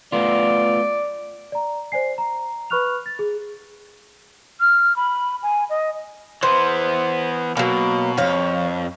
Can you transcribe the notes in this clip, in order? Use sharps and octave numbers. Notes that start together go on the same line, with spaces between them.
A3 B3 F4 D5
D5 A#5
C5 D5 G#5 C7
A#5
B4 B5 C#6 F6 F#6 F7
A6
G#4
F6
B5
G#5
D#5
E3 B3 C5
B2 F#3 A#3
F2 C#5 F5